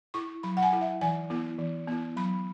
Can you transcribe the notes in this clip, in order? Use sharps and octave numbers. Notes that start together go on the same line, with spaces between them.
E4 C#6
F#3 B5
F#5
G#5
E4
E5
E3 G#5
B3 E4
E3
B3 E4
F#3 B5